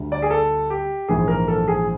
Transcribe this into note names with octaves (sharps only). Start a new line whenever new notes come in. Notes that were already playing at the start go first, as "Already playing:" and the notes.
Already playing: D2 D3 G3
D5
G#4
A4
G4
A#1 G#2 E3 G#4
A#4
A4
G#4